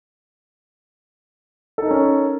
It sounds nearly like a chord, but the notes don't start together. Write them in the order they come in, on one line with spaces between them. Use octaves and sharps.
A4 D#4 A#4 C#4